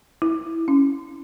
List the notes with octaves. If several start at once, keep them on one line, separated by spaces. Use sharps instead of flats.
E4
C#4